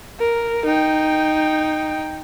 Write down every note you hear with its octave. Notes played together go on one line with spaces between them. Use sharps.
A#4
D#4 G5